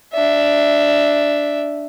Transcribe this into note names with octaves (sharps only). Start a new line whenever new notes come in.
D4 E5